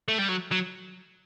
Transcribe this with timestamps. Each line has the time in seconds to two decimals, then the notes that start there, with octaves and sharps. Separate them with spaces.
0.08 A3
0.19 G3
0.29 F#3
0.52 F#3